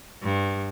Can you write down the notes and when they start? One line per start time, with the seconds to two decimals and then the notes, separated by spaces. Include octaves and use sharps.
0.23 G2